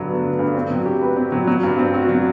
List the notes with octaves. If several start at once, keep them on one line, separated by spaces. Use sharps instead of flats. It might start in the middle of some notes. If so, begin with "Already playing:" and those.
Already playing: G2 D3 F#3
B3
D3
G2
C4
F#3
G4
B4
C4
F#3
F#3
G2
C4
F#4
F#3